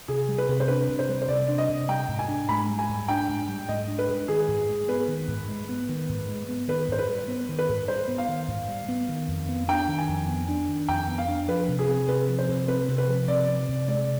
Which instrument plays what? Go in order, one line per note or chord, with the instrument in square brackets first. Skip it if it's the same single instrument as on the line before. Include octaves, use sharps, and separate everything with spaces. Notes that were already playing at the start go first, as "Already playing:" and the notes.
[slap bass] C3 [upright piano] G#4
[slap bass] G3
[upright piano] B4
[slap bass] C3
[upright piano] C5
[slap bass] D4 [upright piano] B4
[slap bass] C3
[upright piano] C5
[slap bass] G3
[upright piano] C5
[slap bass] C3 [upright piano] D5
[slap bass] D4
[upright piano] D#5
[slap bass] C3
[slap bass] G3 [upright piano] G5
[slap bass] G#2
[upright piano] G#5
[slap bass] D4
[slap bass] G#2 [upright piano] B5
[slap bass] G3
[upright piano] G#5
[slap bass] G#2
[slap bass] D4 [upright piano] G5
[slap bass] G#2
G3
[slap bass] G#2 [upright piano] D#5
[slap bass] D4
[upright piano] B4
[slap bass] G#2
[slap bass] D#3 [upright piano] G#4
[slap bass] G#2
G#3
[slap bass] B3 [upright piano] B4
[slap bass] D#3
G#2
G#3
B3
D#3
G#2
G#3
B3
[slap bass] D#3 [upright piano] B4
[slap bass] G#2 [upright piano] C5
[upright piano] B4
[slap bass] G3
B3
D#3
[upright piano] B4
[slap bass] G#2
[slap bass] G3 [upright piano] C5
[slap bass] B3
[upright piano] F5
[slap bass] D#3
G#2
G3
B3
D#3
F2
B3
[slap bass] D4 [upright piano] G5
[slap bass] D#3
[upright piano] G#5
[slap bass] F2
B3
D4
D#3
[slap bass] F2 [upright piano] G5
[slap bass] B3
[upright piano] F5
[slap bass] D4
[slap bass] F3 [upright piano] B4
[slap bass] C3
[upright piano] G#4
[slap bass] C4
[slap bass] C3 [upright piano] B4
[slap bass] F3
[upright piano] C5
[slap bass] C3
[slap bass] C4 [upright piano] B4
[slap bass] C3
[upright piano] B4
[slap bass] F3
[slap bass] C3 [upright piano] D5
[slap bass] C4
C3
[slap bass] G#3 [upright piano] D5